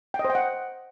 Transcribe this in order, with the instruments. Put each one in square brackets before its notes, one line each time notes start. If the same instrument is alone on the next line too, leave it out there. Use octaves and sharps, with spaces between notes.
[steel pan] G5
D#5
C5
G5
F#5